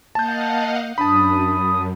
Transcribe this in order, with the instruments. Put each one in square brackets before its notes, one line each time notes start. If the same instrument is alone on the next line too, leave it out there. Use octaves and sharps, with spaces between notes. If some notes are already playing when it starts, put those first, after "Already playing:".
[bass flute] A#3 [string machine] D#5 F5 F#5 [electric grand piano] A5 G6
[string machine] F#2 [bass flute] D4 [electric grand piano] A5 B5 [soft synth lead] D#6